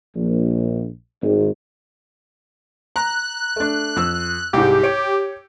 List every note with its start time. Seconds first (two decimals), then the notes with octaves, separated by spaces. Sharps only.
0.16 A#1
1.22 G#1
2.96 A#5 F#6
3.56 A3 D4
3.96 F2 E6
4.53 C2 G#2 G4
4.83 C#5 D7